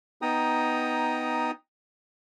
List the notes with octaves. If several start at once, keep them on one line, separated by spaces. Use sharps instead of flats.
B3 D#4 G5 A#5 D#6